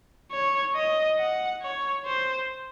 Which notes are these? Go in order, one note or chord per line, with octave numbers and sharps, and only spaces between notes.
C#5
D#5
F#5
C#5
C5